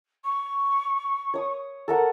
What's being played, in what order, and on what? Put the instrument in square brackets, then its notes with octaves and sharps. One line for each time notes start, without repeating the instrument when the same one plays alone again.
[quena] C#6
[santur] C#5 D#6
A4 A#4 F#5